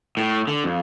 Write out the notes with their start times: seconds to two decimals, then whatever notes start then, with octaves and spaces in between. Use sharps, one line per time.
0.17 A2
0.48 D3
0.64 F2